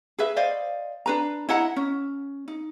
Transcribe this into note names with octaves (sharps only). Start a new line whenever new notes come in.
G#4 B4 E5
C5 D5 D#5 F5
D4 B4 A#5
E4 D#5 F#5 A#5
C#4
D#4